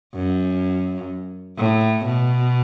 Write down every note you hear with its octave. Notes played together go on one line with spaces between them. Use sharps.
F#2
A2
B2